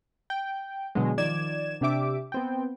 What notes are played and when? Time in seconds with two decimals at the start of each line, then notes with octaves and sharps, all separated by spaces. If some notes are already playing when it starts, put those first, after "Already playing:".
0.30 G5
0.95 B2 D3 F#3 G#3
1.18 D#3 F3 D5 G#6 E7
1.81 C3 D4 G4 E5 D6
2.32 B3 C4 G5